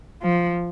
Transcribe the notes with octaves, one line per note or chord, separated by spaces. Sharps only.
F3